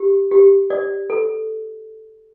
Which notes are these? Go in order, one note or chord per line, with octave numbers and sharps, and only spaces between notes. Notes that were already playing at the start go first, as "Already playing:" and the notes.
Already playing: G4
G4
D5
A4